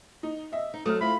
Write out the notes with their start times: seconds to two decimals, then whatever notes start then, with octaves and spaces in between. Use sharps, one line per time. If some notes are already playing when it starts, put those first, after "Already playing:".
0.23 D#4
0.52 D#5 E5
0.74 D#4
0.85 F#3 A3 C4 D#6 F6
1.01 C4 E4 F4 B5